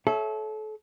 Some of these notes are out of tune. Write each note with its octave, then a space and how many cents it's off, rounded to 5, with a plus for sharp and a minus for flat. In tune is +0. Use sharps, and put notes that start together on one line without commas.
A4 -30 C#5 +0 E5 +0